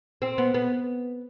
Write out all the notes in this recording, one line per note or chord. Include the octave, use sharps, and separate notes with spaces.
C4
B3
B3